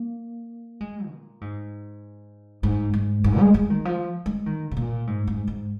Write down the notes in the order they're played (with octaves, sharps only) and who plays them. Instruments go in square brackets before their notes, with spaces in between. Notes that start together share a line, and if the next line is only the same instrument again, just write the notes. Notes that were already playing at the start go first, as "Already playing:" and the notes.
Already playing: [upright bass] A#3
G#3
A#2
G#2
G#2
G#2
G#2
G#3
G#3
D#3
F3
G#3
D#3
C#3
A#2
G#2
G#2
G#2